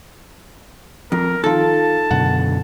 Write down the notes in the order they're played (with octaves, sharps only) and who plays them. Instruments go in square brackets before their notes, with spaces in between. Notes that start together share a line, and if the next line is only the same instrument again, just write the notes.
[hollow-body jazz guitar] F2 [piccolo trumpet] A#4
[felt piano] D#3 F4 [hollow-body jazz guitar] A4 [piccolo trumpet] A5
[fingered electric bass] F#2 B2 D3 [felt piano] F#5